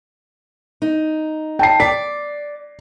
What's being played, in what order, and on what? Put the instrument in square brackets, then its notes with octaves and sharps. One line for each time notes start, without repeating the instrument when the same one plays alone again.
[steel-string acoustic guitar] D#4
[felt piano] G5 A5 C7
[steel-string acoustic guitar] D5 [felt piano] B6